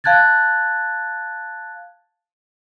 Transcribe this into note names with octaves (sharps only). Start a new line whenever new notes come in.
F5 A5 F#6 G#6 A6